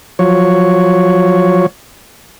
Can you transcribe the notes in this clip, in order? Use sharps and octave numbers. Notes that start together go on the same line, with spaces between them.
F3 F#3 C#5